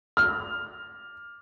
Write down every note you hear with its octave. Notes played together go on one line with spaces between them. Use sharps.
F6